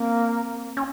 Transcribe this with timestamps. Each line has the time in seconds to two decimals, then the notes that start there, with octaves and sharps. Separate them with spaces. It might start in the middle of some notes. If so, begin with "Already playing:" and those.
Already playing: A#3 C4
0.77 C#4